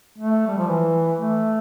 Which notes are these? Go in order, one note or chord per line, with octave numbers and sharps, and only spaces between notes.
A3
G3
F3
E3
A3